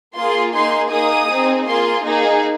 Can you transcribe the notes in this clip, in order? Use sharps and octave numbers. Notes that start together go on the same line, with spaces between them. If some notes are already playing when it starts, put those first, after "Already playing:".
A#3 F4 G#4 C6
A#3 D#4 G#4 C6
A#3 D#4 G#4 D#6
C4 D#4 G#4
A#3 F4 G#4 C6
A#3 D#4 G#4